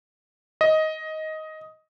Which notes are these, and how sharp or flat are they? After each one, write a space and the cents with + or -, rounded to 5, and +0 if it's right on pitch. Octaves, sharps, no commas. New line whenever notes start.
D#5 +10